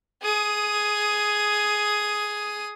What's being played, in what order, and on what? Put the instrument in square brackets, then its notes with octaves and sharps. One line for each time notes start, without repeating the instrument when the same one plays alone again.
[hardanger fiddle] G#4 D#6